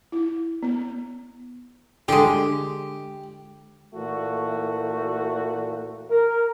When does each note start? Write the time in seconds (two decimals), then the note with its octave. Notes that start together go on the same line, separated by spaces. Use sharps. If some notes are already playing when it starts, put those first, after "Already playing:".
0.12 E4
0.63 B3
2.08 D3 G#3 G4
3.94 A#2 E3 A3 F#4
6.10 A#4